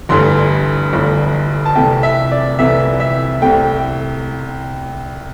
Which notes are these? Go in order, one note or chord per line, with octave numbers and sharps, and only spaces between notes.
G1 G2 E3 A3 C6
G1 G2 E3 A3
A5
C2 C3 E3 A3 G5
E5
D5
C2 C3 E3 A3 E5
E5
C2 C3 A3 G5